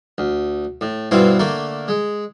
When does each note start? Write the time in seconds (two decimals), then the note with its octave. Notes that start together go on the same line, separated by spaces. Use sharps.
0.18 D2
0.81 A2
1.11 G2 B2 C4 E4 F4 C5
1.39 D3 A3 A#3 A#4
1.88 G#3